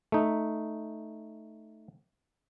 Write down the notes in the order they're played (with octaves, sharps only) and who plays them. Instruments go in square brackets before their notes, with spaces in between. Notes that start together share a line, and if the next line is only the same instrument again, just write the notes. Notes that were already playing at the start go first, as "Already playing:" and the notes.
[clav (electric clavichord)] A3 D#4